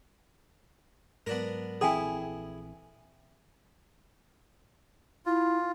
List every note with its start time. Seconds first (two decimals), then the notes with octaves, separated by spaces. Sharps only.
1.27 G#2 F#3 B3 D4 A#4
1.81 A#1 E3 C4 E4 G#4 A4 G5 G#5
5.26 E4 F4